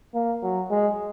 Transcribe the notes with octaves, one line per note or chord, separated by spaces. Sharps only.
A#3
F#3
G#3